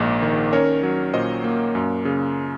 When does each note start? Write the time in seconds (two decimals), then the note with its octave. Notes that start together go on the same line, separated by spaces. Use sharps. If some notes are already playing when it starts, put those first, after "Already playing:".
Already playing: A#1 G#2 A#3 D#5
0.22 D#3
0.53 C#4 A#4 C#5
0.83 F#3
1.13 A#2 C5 D#5
1.44 A#3
1.75 F#2
2.05 C#3